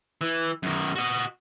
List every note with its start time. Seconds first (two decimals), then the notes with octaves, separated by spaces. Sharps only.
0.21 E3
0.63 F#2 D#3
0.96 F#4 D#5